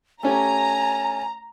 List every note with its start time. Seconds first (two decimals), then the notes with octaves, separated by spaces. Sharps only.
0.23 A3 C#4 G4 G#5 A#5